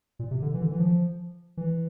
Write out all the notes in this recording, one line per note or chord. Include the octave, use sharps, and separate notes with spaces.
A#2
C3
D3
E3
D3
E3
F3
E3